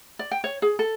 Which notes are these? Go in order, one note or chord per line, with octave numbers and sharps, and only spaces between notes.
D5
G5
C#5
G#4
A4